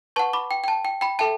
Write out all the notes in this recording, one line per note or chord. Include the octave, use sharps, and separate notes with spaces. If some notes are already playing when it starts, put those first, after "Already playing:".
B4 F#5 A5 C#6
B5 D6
G5
G5
A5
G5
G5 B5
A4 E5 G5 A5